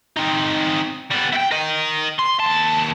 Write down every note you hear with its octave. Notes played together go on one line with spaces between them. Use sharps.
C4 D#4
G3 B3
E4 G5
A#4 D#5
C6
D#2 A5